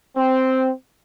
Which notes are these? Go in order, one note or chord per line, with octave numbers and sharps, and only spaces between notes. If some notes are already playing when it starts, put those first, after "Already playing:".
C4